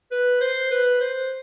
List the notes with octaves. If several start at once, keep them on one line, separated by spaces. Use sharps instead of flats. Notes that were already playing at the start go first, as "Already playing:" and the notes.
B4
C5
B4
C5